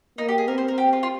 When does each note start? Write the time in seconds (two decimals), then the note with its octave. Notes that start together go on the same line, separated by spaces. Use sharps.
0.18 A#3 D#4
0.29 G4
0.38 G#4
0.48 C4 A#4
0.58 C5
0.68 A#4
0.78 G4
0.93 F4
1.03 F4